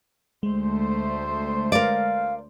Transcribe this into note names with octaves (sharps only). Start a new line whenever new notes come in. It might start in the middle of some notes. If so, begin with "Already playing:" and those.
D2 G#3 A3 C5
A#4 D5 F5